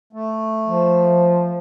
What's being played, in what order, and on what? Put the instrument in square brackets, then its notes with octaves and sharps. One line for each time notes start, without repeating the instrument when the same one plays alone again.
[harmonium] A3
[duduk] F3